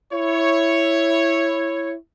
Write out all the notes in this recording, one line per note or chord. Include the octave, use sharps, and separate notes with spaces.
E4 C#5